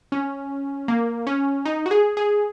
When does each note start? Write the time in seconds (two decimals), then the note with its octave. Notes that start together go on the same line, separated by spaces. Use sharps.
0.12 C#4
0.88 A#3
1.27 C#4
1.66 D#4
1.86 F#4
1.91 G#4
2.17 G#4